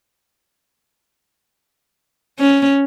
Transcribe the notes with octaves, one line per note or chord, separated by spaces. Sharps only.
C#4